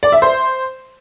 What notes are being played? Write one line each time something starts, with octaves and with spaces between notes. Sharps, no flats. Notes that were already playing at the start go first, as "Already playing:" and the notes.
D5
E5
C5